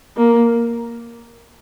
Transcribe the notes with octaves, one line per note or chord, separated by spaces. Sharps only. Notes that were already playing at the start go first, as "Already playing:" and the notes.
A#3